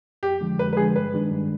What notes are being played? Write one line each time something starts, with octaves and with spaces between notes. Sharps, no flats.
F2 G4
D3 F3 G#3
F2 B4
B4
D3 F3 G#3 G#4
G2 B4
D#3 G#3 D4
G2